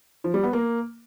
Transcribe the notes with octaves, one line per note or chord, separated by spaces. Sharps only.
F3
G3
B3
A#3